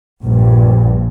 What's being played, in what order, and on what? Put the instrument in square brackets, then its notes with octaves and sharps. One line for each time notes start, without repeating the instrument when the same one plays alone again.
[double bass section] A#1 G2